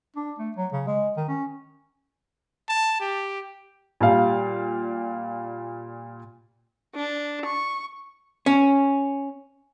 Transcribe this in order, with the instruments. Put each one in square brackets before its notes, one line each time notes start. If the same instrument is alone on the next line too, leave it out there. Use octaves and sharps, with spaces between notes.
[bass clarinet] D4
A3
F#3
C#3
G#3
D#3
C#4
[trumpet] A5
G4
[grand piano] A#2 G3 F5
[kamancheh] D4
C#6
[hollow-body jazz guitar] C#4